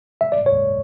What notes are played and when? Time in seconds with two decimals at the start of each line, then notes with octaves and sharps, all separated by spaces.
0.21 E5
0.32 D5
0.46 C#5